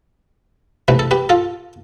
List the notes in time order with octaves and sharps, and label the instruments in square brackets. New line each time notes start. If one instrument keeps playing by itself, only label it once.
[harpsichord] C3 E3 A3 B4
A4
G4 B4
F4 A4